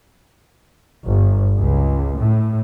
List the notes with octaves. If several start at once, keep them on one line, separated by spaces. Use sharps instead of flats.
G1
C#2
A2